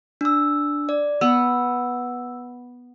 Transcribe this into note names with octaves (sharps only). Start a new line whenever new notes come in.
D4 E6
D5
B3 E6